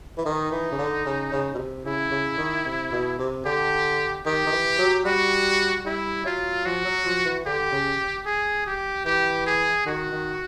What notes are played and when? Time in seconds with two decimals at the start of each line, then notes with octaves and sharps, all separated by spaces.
0.18 E3
0.25 D#3 D#4
0.52 E3
0.72 C#3
0.79 D3
1.06 C#3
1.32 C#3
1.55 B2
1.58 C3
1.85 C#3 E4
2.11 C#3
2.38 D#3
2.66 C3
2.92 B2
3.19 C3
3.45 D3 G4
4.25 D#3 G4
4.47 D#3
4.52 E3
4.78 F#3
5.05 G3 F#4
5.85 G3 E4
6.25 F#3 F4
6.65 F3 F#4
6.85 F#3
7.06 F3
7.25 E3
7.45 D3 G4
7.72 C#3
8.25 G#4
8.66 G4
9.05 E3 G4
9.46 G#4
9.86 D#3 F#4
10.13 D#3